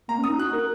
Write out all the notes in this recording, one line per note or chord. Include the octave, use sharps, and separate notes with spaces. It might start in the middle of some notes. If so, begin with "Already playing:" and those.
A#3 A#5
C#4
D#6
D#4
F#4 F#6
A#4